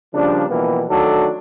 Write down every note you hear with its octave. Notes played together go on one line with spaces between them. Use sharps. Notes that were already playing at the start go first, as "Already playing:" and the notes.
C#3 F3 G3 A#3 D4
B2 E3 F3 G3 A#3 B3
D#3 F#3 A3 D4 F#4 A4